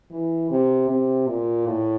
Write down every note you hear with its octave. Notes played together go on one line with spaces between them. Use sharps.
E3
C3
C3
A#2
A2